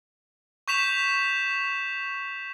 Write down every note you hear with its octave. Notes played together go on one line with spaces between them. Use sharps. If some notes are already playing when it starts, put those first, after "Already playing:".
C#6 G6 B6 E7 F7